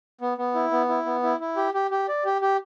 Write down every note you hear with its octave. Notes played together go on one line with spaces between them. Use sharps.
B3
B3
E4
B3
E4
B3
E4
E4
G4
G4
G4
D5
G4
G4